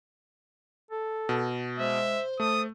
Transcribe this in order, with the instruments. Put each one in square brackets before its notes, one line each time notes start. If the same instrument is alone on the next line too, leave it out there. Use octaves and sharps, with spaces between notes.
[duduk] A4
[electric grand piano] B2
[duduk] G#3 [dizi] C5 [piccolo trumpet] E5
[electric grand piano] A3 [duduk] A4 [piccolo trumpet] D#6